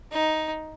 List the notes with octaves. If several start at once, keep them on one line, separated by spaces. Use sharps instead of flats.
D#4